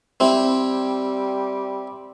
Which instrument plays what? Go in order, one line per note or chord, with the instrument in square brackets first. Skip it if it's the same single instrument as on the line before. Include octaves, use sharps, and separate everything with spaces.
[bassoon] G3 [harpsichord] C4 E4